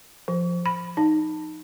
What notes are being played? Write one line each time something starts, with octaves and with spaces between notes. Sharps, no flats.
F3
B5
D#4